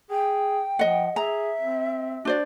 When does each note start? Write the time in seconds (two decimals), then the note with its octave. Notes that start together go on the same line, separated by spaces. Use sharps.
0.10 G#4 G5
0.79 F3 D#5 F#5
1.16 G#4 E5 A#5
1.61 C4
2.25 D4 F#4 C5 D5